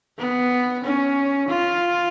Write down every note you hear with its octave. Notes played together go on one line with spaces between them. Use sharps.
B3
C#4
F4